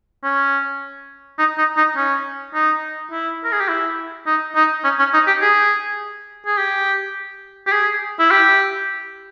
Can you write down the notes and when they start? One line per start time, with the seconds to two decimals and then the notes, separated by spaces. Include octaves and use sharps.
0.24 C#4
1.39 D#4
1.58 D#4
1.77 D#4
1.96 C#4
2.54 D#4
3.11 E4
3.44 A#4
3.52 G#4
3.60 G4
3.69 E4
4.27 D#4
4.56 D#4
4.84 C#4
4.99 C#4
5.14 D#4
5.27 G4
5.42 G#4
6.47 G#4
6.58 G4
7.67 G4
7.72 G#4
8.20 E4
8.31 G4